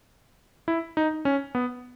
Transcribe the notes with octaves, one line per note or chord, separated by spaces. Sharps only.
E4
D#4
C#4
B3